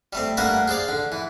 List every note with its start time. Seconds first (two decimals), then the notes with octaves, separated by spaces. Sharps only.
0.13 G3 A3 C4
0.37 G2 A3 A#3 A#4 B4 F#5
0.68 G#4 C5 D5 F5
0.88 D3
1.12 E3